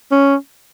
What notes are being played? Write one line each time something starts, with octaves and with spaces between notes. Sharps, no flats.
C#4